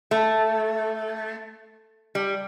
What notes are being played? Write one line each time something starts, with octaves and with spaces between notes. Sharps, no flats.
A3
G3